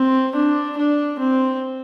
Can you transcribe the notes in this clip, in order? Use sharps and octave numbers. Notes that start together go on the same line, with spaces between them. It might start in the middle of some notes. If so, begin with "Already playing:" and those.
Already playing: C4
D4
D4
C4